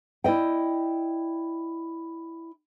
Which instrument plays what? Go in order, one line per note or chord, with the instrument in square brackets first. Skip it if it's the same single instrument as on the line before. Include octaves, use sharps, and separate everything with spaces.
[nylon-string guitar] E4 D5 D#5 G5